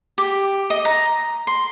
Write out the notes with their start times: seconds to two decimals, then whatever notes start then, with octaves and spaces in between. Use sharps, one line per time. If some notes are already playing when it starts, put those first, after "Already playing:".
0.18 G4
0.70 D#5
0.85 A#5
1.47 C6